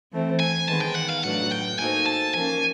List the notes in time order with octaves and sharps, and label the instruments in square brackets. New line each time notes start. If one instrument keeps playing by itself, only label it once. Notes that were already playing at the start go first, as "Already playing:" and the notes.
[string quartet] E3 A3 C4
[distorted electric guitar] G#5
[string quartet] D#3 G#3 B3 [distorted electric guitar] A5
[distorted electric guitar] G5
F#5
F5
[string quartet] A2 F#3 B3 D4 [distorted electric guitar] F#5
[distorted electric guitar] G5
[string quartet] A#3 D#4 F#4 A4 C5 [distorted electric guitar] G#5
[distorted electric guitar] A5
[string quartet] F3 A#3 C#4 [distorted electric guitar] G#5